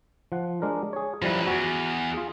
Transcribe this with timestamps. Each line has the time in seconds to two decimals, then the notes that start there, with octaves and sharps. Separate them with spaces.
0.32 F3 F#5
0.62 G#3 D4 A#4
0.93 G#4 C#5
1.22 F#2 F3 G3 E4 B4
1.47 E2 F#4
2.14 F4 G#4